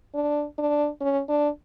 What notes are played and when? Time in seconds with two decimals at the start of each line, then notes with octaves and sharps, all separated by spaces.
0.15 D4
0.58 D4
1.01 C#4
1.29 D4